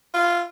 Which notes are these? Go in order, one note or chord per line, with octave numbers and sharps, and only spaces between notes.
F4